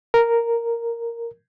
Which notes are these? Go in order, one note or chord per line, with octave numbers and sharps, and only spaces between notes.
A#4